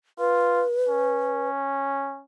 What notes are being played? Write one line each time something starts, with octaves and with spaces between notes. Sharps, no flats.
F4 B4
C#4